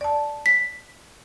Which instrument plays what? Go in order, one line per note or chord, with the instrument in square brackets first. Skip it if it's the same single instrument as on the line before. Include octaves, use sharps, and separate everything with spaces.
[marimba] D5 A5
[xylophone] B6